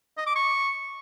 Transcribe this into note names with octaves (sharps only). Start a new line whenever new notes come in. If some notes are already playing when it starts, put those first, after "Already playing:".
D#5
D6
C#6